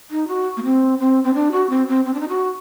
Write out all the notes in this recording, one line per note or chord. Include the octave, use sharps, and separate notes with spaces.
D#4
F#4
A#3
C4
C4
C4
D4
F#4
C4
C4
C4
D4
D#4
F#4